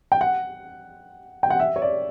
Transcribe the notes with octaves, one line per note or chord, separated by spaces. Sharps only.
G5
F#5
G5
F#5
E5
C#5
D5